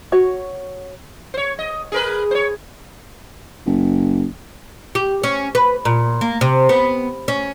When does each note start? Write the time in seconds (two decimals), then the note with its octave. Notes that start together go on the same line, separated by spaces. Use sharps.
0.12 F#4 C#5
1.34 C5 C#5
1.59 D#5
1.92 G#4 A#4 B4
2.31 C5 C#5
3.66 F#1
4.95 G4
5.24 C#4
5.55 B4
5.85 A#2
6.21 A#3
6.41 C3
6.69 B3
7.28 C#4